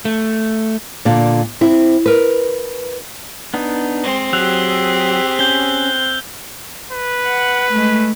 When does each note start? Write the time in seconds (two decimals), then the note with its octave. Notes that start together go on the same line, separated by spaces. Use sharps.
0.05 A3
1.05 A#2 D3 D5 F5
1.61 C4 E4
2.06 A#4 B4
3.54 B3 D4 D#4
4.03 G#3 C4
4.33 F#3 G4 G#4 E6 F#6 F7
5.39 C#4 G6 G7
6.92 B4
7.26 F#5
7.71 G#3 A3